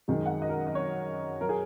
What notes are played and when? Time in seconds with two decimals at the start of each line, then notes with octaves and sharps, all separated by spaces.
0.08 F#2 D#3 G#3
0.26 F#5
0.42 D#5
0.49 A#4
0.67 D#5
0.75 C#5
1.41 F#3 A#4
1.49 G#4